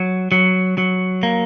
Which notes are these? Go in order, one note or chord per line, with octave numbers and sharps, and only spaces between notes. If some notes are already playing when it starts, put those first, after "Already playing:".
Already playing: F#3
F#3
F#3
A#3